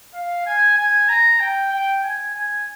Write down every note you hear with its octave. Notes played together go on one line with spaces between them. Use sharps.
F5
G#5
G#5
A#5
G5
G5
G#5
G#5